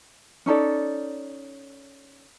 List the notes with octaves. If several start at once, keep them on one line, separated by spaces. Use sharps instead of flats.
C#4 D#4 A4 D5